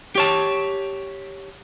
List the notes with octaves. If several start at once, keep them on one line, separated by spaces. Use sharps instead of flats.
G4 C#5 A5